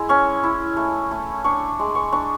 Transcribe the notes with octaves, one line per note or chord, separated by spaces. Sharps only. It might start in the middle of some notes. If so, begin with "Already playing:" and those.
Already playing: G#3 E4
C#4 C#6
E4
A3
A3
D4 C#6
G#3
C#6
D4 C#6